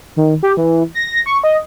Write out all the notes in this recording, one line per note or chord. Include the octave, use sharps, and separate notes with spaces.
D#3
G4
E3
A#6
C#6
D#5